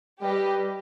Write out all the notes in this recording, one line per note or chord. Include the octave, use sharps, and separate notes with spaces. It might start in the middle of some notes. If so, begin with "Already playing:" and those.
G3 G4 B4 D#5